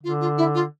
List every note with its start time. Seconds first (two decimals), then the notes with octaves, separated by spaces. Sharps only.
0.03 D3 F4
0.20 F4
0.37 E4
0.54 F4